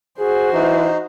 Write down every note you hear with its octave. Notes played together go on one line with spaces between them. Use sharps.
F#4 G#4 C5
E3 D#4